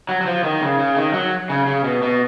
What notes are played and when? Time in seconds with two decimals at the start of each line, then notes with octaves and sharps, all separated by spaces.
0.09 F#3
0.21 F#3
0.26 F3
0.44 D#3
0.61 C#3
0.79 C#3
0.97 D#3
1.14 F#3
1.50 C#3
1.67 C#3
1.84 B2
2.02 B2